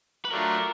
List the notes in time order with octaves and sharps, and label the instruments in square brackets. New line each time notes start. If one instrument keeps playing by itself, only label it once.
[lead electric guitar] B4
[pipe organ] F#3 A3 D4 F4 [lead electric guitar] A#4